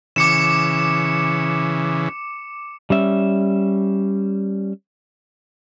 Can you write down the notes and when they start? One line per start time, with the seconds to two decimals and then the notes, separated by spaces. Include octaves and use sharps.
0.16 C#3 E3 D6 C#7 E7
2.90 G3 C#4 E5